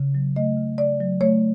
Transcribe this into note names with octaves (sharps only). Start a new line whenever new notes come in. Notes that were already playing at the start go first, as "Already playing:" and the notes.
Already playing: C#3
F#3
A3 D#5
C#3
C#3 D5
F#3
A3 C#5